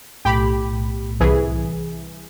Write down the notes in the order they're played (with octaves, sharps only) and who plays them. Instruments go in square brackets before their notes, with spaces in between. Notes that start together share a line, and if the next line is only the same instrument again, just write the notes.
[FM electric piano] B1 A2 [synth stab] G4 B5
[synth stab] C2 E3 G#4